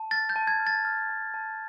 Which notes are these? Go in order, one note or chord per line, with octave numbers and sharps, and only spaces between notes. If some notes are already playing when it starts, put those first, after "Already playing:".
Already playing: A5
F6 A6
G6
A5
G#6
F6
A6
F6
A5
A5